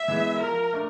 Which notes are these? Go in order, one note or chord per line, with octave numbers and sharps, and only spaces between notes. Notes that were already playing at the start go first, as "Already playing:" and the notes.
Already playing: E5
E3 G#3 B3 E4
F3 A#4
A3 D4